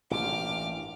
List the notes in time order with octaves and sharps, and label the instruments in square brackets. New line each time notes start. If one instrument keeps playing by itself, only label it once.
[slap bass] A1 G2 A#2 [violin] D6 F6